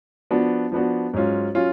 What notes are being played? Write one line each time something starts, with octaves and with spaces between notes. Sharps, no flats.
F3 B3 D4 F#4
F3 B3 D4 F#4
G#2 F#3 C#4 F4
F#3 C#4 F4